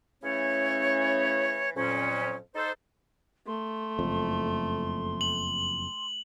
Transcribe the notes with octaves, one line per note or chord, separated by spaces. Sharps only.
C#3 E3 A3 C#4 E4 C#5
F2 A#2 F#3 C#4
D#4 A4 C5
A3 C6
F#1 F2
F#7